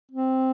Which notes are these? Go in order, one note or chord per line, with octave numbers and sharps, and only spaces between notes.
C4